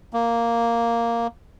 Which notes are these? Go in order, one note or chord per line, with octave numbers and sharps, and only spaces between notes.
A#3